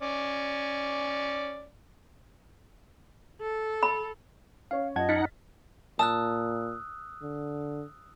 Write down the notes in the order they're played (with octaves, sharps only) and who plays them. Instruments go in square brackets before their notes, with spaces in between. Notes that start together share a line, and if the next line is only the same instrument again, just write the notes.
[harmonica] C#4 D5
[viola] A4
[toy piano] B5
[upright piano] C#4 C#5 [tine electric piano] F5
[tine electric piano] F#2 A5 G#6 [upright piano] F4 F#5 [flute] D#5
[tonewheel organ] D#4 F#5 [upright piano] F6 A6 B6
[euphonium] A#2 [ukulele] A5 [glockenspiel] D#6 E6 F#6
[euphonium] D3